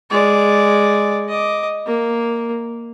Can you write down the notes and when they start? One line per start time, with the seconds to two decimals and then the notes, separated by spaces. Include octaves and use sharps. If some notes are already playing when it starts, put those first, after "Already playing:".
0.10 G#3 D5
1.28 D#5 D6
1.86 A#3